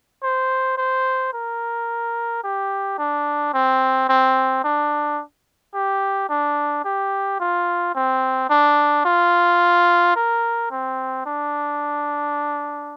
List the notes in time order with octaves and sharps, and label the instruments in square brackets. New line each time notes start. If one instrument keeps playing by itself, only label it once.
[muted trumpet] C5
C5
A#4
G4
D4
C4
C4
D4
G4
D4
G4
F4
C4
D4
F4
A#4
C4
D4